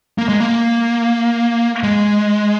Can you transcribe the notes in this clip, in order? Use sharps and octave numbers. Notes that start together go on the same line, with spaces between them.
A#3
G#3
A#3
G#3